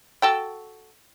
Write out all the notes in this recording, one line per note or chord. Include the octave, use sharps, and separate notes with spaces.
F#4 A4 G5